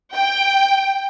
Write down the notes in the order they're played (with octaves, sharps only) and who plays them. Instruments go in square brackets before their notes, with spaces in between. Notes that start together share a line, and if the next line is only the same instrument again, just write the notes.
[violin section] G5